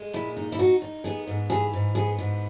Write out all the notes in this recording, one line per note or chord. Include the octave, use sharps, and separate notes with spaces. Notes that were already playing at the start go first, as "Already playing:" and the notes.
Already playing: G#3
A#2 E4
D#4
E4
D#4 F#4
D#4
B3 G#4
G#2
E3 G#4
G#2
B3 G#4
G#2